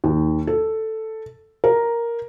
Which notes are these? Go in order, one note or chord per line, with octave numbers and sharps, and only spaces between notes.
D#2
A4
A#4